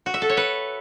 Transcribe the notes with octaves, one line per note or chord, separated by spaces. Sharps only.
F#4
E5
A4
C#5
B4